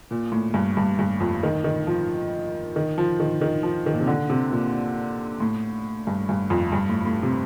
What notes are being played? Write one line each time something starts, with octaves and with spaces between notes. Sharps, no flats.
A#2
A2
G2
G2
G2
F2
D#3
D#3
F3
D#3
F3
D#3
D#3
F3
D#3
A#2
C3
D3
C3
A#2
A2
G2
G2
F2
G2
A2
A2
C3